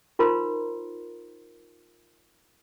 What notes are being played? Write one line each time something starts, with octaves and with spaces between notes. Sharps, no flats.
D#4 F4 A#4 C5 A#5 C6